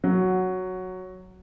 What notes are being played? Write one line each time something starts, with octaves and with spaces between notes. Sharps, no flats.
F#3